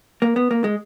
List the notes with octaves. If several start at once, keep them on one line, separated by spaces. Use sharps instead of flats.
A#3
B3
A#3
G#3